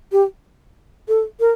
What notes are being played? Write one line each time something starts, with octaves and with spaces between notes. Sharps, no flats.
G4
A4
A#4